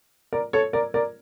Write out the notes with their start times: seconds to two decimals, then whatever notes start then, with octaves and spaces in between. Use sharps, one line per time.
0.33 A#4 D5
0.53 A4 C#5
0.73 A#4 D5
0.94 A#4 D5